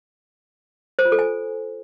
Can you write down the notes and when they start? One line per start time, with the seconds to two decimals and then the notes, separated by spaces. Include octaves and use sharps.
0.99 C5
1.05 F4
1.12 A4
1.19 G#5